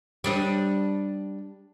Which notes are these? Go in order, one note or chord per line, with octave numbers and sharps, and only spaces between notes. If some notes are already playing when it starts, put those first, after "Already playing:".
G3 D4 D#5